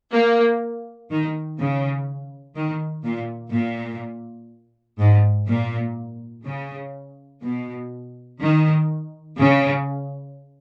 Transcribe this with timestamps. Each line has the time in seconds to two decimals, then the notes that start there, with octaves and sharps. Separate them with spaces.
0.12 A#3
1.10 D#3
1.59 C#3
2.55 D#3
3.04 A#2
3.53 A#2
4.99 G#2
5.48 A#2
6.45 C#3
7.44 B2
8.41 D#3
9.38 C#3